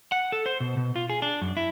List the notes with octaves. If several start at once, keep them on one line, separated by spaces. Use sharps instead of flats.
F#5
A4
C5
B2
B2
F4
G#4
D4
F#2
E4